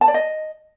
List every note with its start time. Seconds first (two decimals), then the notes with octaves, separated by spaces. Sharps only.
0.01 A5
0.08 D5
0.14 D#5